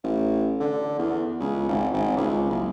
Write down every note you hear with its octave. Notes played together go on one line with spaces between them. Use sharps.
A1
D3
E2
C#2
G#1
G#1
C#2
F#1